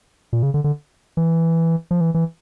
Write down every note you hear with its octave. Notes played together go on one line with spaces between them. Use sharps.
A#2
C#3
D3
D3
E3
F3
E3
E3